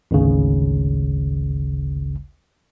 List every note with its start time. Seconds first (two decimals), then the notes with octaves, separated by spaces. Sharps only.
0.11 G#1 D2 C#3